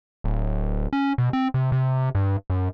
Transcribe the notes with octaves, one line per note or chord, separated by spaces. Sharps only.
D1
C#4
B2
C4
C3
C3
G2
F#2